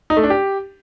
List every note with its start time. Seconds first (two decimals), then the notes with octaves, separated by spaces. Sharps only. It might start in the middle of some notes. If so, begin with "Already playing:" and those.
0.10 D#4
0.17 A3
0.23 D4
0.30 G4